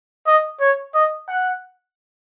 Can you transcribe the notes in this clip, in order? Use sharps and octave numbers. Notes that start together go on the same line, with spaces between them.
D#5
C#5
D#5
F#5